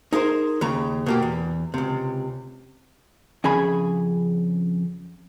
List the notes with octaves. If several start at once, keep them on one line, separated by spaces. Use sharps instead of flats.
D#4 G#4 A#4 C5
D#2 C#3 A#5
B2 A#3 G4
E2
C#2 C3
F2 C#3 G#4 G#5 B5